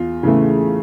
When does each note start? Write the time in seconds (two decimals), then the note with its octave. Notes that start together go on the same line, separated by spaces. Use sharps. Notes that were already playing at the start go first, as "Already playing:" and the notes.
Already playing: E2 F4
0.23 C#3 E3 A3